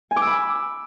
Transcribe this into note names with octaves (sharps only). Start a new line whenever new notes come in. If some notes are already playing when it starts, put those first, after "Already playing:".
G#5
D6
E6
B5